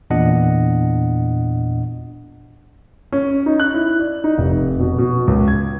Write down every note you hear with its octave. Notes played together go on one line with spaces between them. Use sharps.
E2 A#2 D4 D#5 F#5
C#4
D#4
F#6
E4
D5
D#4
F1
B2
B2
C#2
G#6